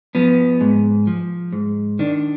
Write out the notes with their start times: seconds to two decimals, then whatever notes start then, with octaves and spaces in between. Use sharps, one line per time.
0.15 F3 B3
0.61 G#2
1.07 F3
1.52 G#2
1.99 D#3 D4